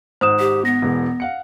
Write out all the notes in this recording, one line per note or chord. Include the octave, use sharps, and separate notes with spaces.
G#1 G#2 C5 D#6 E7
G4
B3 A#6
E1 E3 G#3
F5 F#5 C#7